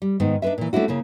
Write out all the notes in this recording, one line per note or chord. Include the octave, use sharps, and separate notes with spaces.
G3
G#2 D#3 B3
D4 D#4 F4 B4 E5
A#2 E3
A3 C#4 D4 E4 F#4
C#3 A#3 E4